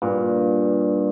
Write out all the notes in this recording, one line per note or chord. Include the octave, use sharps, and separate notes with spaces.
G2 A#2